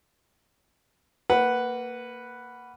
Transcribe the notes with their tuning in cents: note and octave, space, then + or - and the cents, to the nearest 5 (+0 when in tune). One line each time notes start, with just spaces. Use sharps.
A#3 -20 B4 +0 F#5 +5